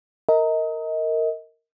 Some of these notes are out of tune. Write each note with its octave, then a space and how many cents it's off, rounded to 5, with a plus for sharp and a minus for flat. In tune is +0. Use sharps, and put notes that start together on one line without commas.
A#4 -15 D#5 +30